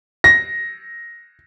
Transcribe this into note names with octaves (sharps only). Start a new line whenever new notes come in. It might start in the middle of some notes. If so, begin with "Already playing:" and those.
A#6